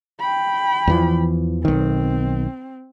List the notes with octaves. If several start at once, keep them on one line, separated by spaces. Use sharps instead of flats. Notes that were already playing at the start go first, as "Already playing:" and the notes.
G5 B5
E2 E3 F3
B1 D#3 C4